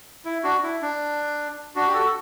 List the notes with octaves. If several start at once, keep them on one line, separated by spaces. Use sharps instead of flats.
E4
D4 F#4
E4
D4
D4 F#4
G4
F#4 A4